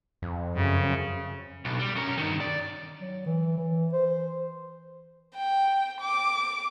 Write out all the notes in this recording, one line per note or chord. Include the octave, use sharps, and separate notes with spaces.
F2
F#2 C#3
B1
G3
C#4 A#4
G2 D#3
D5
F#3
E3
E3
C5
G5
D6